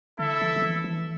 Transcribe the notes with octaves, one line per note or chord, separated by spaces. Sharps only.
D3 E4 A4 E5
E3
F#3
E3
E3